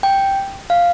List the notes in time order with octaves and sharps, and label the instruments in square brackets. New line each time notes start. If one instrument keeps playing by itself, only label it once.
[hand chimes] G5
F5